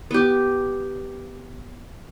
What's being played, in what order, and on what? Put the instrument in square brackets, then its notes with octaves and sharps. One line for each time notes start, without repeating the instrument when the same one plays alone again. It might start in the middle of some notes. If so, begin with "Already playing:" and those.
[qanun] B3 G4